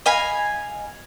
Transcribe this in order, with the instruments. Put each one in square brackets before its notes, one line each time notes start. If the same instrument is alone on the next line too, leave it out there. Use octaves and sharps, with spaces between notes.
[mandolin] D#5 F5 G#5 B5